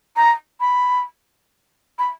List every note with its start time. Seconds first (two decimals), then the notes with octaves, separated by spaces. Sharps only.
0.16 A#5
0.60 B5
1.99 B5